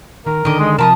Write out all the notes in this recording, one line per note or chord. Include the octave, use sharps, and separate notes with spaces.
D#3 A#4
D3 D#3 D#5 D6
G#3
C3 F3 A#4 A5 B5 D#6